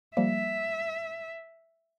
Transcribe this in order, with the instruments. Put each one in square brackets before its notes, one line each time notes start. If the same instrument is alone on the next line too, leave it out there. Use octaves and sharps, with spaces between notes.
[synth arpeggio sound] F3 G3 A#3 [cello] E5